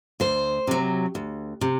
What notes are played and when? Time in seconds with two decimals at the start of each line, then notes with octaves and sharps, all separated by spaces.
0.20 D2 C5
0.67 C3 F#3
1.15 D2
1.61 C3